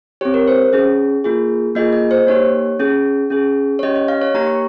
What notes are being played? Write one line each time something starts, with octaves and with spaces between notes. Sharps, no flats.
C4 G4 C#5
A#4
C5
C#4 G#4
A#3 F4 G#4
A#3 F4 G#4 D#5
D#5
C5
A#3 D#4 G4 C#5
C#4 G#4
C#4 G#4
C#5
C#4 G4 D#5
D#5
F5
C#5
A#3 D#4 G4 A#5
C#6